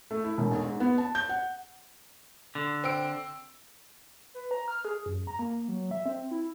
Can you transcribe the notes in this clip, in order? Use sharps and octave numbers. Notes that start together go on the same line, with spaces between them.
A3
E4
E1
B1
G#2
B3
A5
G6
F#5
D3
C4 E6 D7
B4
A#5
F6
G#4
F#2
A#5
A#3
F#3
E5
C4
E4